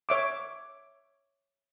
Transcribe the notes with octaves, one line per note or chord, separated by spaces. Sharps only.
C#5 E5 D6